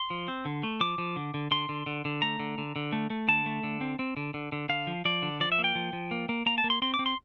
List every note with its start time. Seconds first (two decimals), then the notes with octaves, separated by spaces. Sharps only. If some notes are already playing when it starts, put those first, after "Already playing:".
Already playing: C6
0.10 F3
0.28 C4
0.45 D3
0.63 A3
0.81 F3 D6
0.98 F3
1.16 D3
1.34 D3
1.51 D3 C6
1.69 D3
1.86 D3
2.05 D3
2.22 A3 A#5
2.39 D3
2.58 D3
2.76 D3
2.93 A3
3.10 A3
3.28 D3 A5
3.46 A3
3.63 D3
3.81 C4
3.99 C4
4.17 D3
4.34 D3
4.52 D3
4.69 D3 F5
4.87 F3
5.05 F3 D5
5.22 D3
5.40 F3 D5
5.52 E5
5.59 A#3
5.64 G5
5.75 F3
5.93 F3
6.11 A#3
6.29 A#3
6.46 A#3 A#5
6.58 A5
6.64 A#3
6.70 C6
6.82 C4 C6
6.94 D6
6.99 C4
7.06 C6